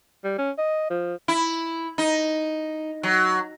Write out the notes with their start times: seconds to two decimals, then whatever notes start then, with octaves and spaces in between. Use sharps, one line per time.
0.24 G3
0.38 C#4
0.58 D#5
0.90 F3
1.28 E4
1.98 D#4
3.03 F#3